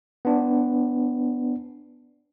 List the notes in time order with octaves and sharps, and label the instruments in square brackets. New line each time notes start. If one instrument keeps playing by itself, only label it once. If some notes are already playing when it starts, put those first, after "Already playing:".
[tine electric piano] B3 D4